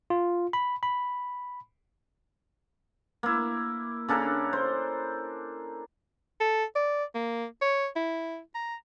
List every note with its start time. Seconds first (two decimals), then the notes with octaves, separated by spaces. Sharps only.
0.10 F4
0.53 B5
0.83 B5
3.23 A#3 E4
4.09 C#3 D4 A4 A#4
4.53 C5
6.40 A4
6.76 D5
7.15 A#3
7.61 C#5
7.96 E4
8.55 A#5